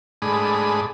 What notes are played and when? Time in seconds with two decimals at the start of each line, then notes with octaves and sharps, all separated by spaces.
0.22 G#2 A3 D4 G#4 B5 D#6